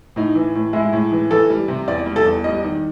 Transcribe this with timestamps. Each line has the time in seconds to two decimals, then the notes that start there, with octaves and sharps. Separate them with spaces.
0.16 A2 D#4
0.35 E3
0.55 A2
0.73 G#3 E4
0.93 A2
1.12 E3
1.31 E3 A4
1.50 G3
1.68 C3
1.88 E2 D5
2.06 G3
2.16 A4
2.26 E2
2.44 G3 D#5
2.64 D#3